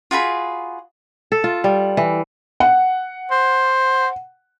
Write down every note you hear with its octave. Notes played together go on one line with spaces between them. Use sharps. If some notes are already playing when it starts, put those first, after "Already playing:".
F4 F#4 G#4 B5
A4
F4
G3
E3
F#5
C5